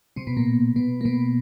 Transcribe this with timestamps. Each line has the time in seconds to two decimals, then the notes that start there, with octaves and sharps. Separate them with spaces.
0.16 C3 C4
0.27 B2 B3
0.37 A#2 A#3
0.76 B2 B3
1.01 A#3
1.05 B2 B3